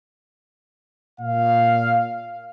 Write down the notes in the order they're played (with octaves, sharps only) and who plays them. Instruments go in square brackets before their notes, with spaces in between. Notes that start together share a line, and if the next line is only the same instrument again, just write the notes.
[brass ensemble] A#2 F5